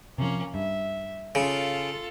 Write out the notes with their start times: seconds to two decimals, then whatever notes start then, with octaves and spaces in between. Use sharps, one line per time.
0.18 C3 F3 A#3 C#4
0.54 G2 E5
1.35 C#3 F4 A4